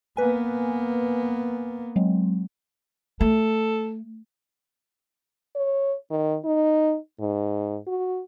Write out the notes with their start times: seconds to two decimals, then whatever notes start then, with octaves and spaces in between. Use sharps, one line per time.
0.17 A#3 B3 B4 G#5
1.96 F#3 G#3 C4
3.21 A3 A4
5.56 C#5
6.10 D#3
6.44 D#4
7.20 G#2
7.87 F#4